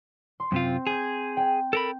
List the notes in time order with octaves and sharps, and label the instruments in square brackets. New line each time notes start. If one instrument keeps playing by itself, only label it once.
[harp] C6
[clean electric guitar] F#2 C3 F4 [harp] C4
[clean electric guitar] G#4 [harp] G6 G#6
[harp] G5
[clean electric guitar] A4 A#4 B5